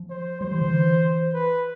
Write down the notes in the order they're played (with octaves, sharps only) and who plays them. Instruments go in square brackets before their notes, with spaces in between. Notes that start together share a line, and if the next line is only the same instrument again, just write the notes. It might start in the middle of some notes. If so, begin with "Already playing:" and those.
Already playing: [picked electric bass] F3
[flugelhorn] C5
[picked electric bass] G3 [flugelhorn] C5
[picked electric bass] E3
D3
E3
[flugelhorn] B4